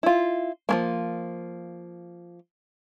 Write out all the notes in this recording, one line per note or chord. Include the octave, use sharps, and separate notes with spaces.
E4 F4
F3 G#3 A#3